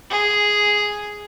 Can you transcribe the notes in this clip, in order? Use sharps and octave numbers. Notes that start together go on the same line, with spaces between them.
G#4